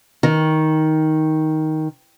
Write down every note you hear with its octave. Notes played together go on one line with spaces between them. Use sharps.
D#3